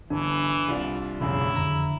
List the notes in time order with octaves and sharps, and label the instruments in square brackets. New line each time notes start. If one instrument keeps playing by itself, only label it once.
[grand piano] G1 [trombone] E3 [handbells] D4
[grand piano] C2 F4 D5
[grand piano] E1 C#2 F#2 [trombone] E4
[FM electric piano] F2 D3 [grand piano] A#5